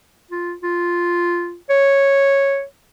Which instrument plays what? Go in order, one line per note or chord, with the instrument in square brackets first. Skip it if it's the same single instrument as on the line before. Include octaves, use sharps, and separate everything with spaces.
[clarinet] F4
F4
C#5